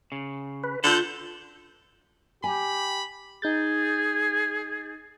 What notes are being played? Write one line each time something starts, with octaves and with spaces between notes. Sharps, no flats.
C#3
B4
D3 F4 A4 G6
G4 G#5 B5
D#4 G#4 G6 A6